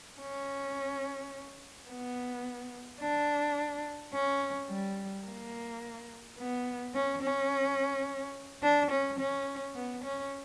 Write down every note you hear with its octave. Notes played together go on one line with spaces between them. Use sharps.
C#4
B3
D4
C#4
G3
A#3
B3
C#4
C#4
D4
C#4
C#4
B3
C#4